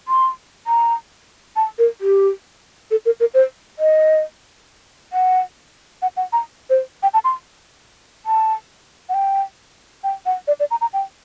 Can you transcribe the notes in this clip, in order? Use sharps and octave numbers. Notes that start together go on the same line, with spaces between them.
C6
A#5
A5
A#4
G4
A4
A#4
A#4
C5
D#5
F#5
F#5
F#5
A#5
C5
G5
A5
C6
A5
F#5
G5
G5
F#5
D5
D5
A#5
A#5
G5